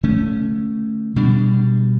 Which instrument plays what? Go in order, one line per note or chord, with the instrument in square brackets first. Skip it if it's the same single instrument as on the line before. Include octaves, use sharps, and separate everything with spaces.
[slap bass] D3 A3 C#4
B2 G3 D4